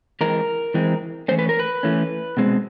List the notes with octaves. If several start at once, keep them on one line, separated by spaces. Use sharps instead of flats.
E3 G#3 C4 A#4
E3 G#3 C4
E3 A3 C#4 C5
B4
A#4
B4
E3 A3 C#4
B2 G#3 C4